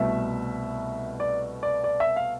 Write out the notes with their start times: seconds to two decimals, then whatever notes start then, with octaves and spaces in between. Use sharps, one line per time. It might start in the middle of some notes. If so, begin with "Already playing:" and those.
Already playing: C2 B2 A3 E5
1.20 D5
1.63 D5
1.84 D5
2.00 E5
2.16 F5